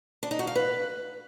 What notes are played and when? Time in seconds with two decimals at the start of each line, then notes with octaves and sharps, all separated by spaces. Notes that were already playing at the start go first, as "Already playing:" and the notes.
0.23 D4
0.31 D#4
0.39 F#4
0.47 F5
0.55 B4